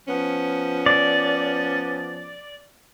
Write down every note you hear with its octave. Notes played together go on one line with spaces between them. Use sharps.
F3 B3 C#4
D5